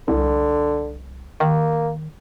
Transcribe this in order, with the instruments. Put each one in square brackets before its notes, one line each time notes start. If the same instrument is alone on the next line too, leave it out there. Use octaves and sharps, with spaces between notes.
[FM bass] C2 [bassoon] D3
[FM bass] D#3 [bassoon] A#3